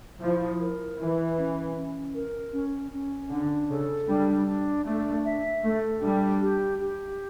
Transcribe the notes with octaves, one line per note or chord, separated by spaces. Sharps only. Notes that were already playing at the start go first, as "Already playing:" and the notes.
F3 E4
A#4
E3 E4
C#4
C#4
A#4
C#4
C#4
D3 D4
C#3 A4
G3 D4
D4
A3 D4
E5
A3 A4
G3 D4
G4
G4